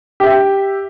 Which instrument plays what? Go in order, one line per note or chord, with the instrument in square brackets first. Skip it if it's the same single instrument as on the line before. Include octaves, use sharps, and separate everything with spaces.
[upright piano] G4 E5